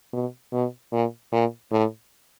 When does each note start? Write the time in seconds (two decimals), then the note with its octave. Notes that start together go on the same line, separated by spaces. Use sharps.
0.13 B2
0.53 B2
0.92 A#2
1.32 A#2
1.71 A2